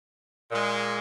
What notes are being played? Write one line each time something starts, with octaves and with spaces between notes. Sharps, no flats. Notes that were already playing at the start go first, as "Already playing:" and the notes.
A#2 G#3